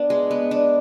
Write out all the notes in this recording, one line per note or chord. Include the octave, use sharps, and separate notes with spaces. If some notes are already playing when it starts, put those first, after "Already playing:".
Already playing: B3 D4
G#3
B3
D4